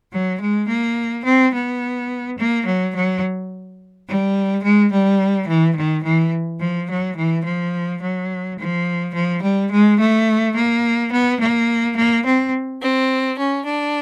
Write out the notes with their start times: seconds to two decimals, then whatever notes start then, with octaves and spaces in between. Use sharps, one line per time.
0.12 F#3
0.40 G#3
0.68 A#3
1.24 C4
1.53 B3
2.37 A#3
2.65 F#3
2.94 F#3
4.07 G3
4.63 G#3
4.91 G3
5.47 E3
5.75 D#3
6.03 E3
6.60 F3
6.89 F#3
7.16 E3
7.45 F3
8.01 F#3
8.58 F3
9.14 F3
9.42 G3
9.70 G#3
9.99 A3
10.56 A#3
11.11 B3
11.39 A#3
11.96 A#3
12.24 C4
12.80 C4
13.37 C#4
13.66 D4